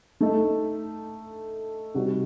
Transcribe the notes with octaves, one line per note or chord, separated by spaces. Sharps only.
A3 D#4 A4
C3 G3 C4 D#4 F#4